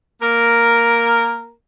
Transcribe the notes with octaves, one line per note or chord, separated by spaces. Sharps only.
A#3 A#4